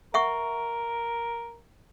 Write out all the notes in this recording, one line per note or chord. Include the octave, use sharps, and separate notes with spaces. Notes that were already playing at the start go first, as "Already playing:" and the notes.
A#4 E5 F#5 C#6